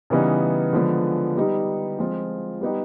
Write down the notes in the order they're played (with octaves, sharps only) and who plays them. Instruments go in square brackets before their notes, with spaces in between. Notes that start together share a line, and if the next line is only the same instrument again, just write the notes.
[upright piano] C#3 E3 G3 B3 D#4
D3 F3 G#3 B3
G3 B3 D#4 G4
F3 G#3 C4 F4
G3 B3 D#4 G4